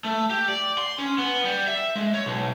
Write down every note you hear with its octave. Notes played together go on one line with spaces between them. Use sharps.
A3
G4
D5
C6
C#4
B3
G3
E5
G#3
C#5
B1